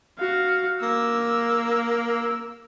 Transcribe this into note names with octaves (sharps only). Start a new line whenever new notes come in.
F#4 F5
A#3 E6